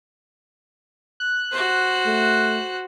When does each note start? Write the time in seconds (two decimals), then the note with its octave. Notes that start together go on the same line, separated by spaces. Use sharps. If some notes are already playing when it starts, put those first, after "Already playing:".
1.20 F#6
1.52 F#4 C5
2.06 A3